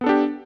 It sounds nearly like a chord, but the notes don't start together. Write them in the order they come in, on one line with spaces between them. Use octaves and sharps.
B3 A4 D4 G4